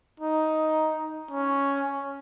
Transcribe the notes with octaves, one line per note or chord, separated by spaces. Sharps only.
D#4
C#4